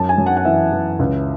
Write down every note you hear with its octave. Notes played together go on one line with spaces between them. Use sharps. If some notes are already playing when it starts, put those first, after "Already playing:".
Already playing: F#2 A5
G#5
F#2
F#5
F#5
E3 E5
E3
C#2